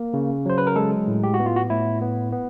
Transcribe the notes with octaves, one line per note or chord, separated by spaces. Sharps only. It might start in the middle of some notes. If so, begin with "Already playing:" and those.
Already playing: A#3
C#3
F#3 C5
B4
A#4
G#3 A4
A2
G4
F#4
B3
F4
F#4
A2 E4
B3
B3